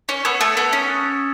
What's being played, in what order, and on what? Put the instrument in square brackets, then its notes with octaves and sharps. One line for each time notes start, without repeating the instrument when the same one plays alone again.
[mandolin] C#4
[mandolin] B3 [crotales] E6 G#6 C#7 E7
[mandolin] A3
B3
C#4
[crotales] D#6 F#6 A6